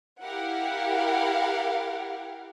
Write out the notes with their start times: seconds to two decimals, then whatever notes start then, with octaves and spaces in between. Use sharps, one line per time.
0.22 E4 G4 A#4 F5 F#5